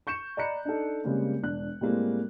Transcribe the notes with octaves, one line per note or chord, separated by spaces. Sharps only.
C#6 G6 C#7 E7
D5 D#5 A#5 B5 F#6 C#7
D4 D#4 A4
C#3 G3 G#3 A#3 C4
E1 D4 F#6
A2 G3 G#3 A#3 C4